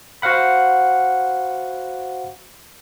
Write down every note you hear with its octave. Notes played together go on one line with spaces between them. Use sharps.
F#4 C5 F5 F#5 B5